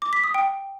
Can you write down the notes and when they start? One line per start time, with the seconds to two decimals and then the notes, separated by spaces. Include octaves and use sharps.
0.02 D6
0.13 B6
0.24 D#6
0.34 G5